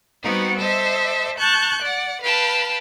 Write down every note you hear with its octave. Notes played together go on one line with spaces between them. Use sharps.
G3 B3 C4 D#4 F#4 F#5
A4 C5 D#5 E5
A5 C#6 F#6 G6
D5 F#5
B4 F5 G5 A5 B5